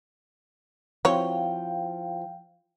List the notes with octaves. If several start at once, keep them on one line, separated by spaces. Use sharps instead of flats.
F3 C4 E4 F#4 C#5 F5 G5